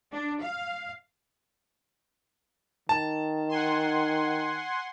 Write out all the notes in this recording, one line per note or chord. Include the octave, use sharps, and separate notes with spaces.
D4
F5
D#3 A5
F#5 G#5 C6